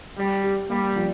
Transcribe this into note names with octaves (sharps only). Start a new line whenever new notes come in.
G3 G4
G4
G3 A#3
F3